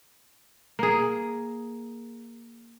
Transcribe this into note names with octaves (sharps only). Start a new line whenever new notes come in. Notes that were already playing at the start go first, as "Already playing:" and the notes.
A#3 G#4